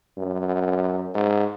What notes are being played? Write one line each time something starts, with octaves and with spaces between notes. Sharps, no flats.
F#2
G#2